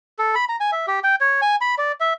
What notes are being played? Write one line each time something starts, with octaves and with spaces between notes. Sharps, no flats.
A4
B5
A#5
G#5
E5
G4
G5
C#5
G#5
B5
D5
E5